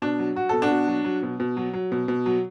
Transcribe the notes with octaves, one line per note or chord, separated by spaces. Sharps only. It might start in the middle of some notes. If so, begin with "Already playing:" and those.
B2 D4
F#3
F#3 F#4
B2 A4
D4 F#4
B2
F#3
F#3
B2
B2
F#3
F#3
B2
B2
F#3